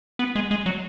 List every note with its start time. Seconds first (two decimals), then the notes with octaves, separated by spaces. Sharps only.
0.19 B3
0.36 G#3
0.51 G#3
0.66 F#3